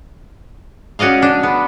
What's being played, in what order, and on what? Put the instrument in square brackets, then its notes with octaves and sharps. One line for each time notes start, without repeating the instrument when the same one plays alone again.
[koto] C#4 F#4 D5 D#5 F5
D4
B3